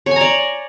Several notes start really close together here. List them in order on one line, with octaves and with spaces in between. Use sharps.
C#5 G#5 A#5 D5